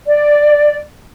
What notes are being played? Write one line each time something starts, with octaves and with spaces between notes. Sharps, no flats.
D5